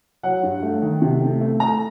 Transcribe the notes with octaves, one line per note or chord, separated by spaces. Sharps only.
F#3 F#5
G2
A3
D#3
C3
A3
A3
A3 A#5